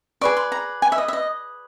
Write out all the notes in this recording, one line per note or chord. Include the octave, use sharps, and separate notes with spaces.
G#4 B4 D5 C#6
C6
A#5
G#5
E5
D#5
E5
D#5